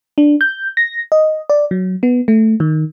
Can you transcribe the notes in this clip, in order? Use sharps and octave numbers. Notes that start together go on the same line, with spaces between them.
D4
G6
A#6
D#5
D5
F#3
B3
A3
D#3